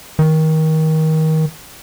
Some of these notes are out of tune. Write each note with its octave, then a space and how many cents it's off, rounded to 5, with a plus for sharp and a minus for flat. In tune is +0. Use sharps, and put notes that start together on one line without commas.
D#3 +25